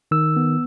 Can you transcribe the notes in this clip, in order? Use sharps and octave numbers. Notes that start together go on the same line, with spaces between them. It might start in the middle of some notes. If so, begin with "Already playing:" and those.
D#3 E6
B3